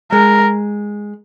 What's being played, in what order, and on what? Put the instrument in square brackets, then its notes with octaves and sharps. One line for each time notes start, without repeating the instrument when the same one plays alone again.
[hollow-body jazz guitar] G#3 [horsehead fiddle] A#4